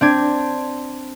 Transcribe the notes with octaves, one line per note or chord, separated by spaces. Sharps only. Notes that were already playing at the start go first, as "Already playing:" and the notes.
C4 D4 G#6